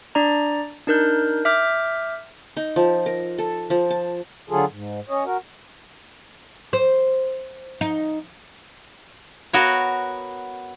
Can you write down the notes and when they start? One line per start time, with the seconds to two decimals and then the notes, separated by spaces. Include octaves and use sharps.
0.15 D4 D5 A#5
0.87 D4 D#4 A#4 F#6 G6
1.45 E5 D6 F6 G6
2.57 D#4
2.76 F3
3.06 A#4
3.38 A4
3.70 F3
3.90 A5
4.50 D3 F#3 F4 G#4 A4
4.71 G#2
5.09 C#4 C#5 D#5
5.25 F#4 A#4
6.73 C5
7.81 D#4
9.53 B3 F#4 A#4 C#5